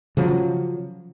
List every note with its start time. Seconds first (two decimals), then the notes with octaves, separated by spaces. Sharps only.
0.17 C#3 F3 F#3